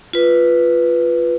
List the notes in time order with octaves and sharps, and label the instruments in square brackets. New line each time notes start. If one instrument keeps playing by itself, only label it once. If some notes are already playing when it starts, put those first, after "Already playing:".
[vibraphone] F4 B4